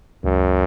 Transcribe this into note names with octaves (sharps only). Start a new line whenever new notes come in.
C#2 F#2